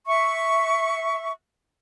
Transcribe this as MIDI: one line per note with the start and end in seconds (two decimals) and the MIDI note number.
0.07 1.31 76
0.07 1.31 85